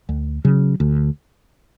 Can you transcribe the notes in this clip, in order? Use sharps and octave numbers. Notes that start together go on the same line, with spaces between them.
D2
C#3 F#3
D2